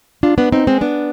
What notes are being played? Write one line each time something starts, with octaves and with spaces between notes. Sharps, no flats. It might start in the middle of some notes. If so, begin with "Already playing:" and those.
D4 F4
B3 D4
C4 D#4
G#3 C4
B3 D4